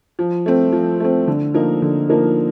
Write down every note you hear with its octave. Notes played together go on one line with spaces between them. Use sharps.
F3
A3 C4
F3
A3 C4
D3
F3 A#3 D#4 A#4
D3
F3 A#3 D#4 A#4